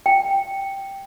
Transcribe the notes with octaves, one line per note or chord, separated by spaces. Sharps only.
G5